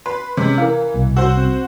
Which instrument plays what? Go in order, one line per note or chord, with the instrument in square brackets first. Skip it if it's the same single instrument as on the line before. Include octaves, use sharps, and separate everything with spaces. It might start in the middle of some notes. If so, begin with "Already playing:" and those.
[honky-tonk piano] B4 [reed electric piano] C6
[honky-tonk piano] C3 [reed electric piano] G#3 C#4
[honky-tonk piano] E3 [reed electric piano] A#4 F5
[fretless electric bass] C2 [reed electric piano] B2
[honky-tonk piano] F#4 C5 [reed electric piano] E6
[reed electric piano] C4